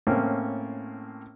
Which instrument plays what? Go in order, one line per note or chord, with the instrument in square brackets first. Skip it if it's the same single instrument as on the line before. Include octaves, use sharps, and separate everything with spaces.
[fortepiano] A2 A#3 C4 C#4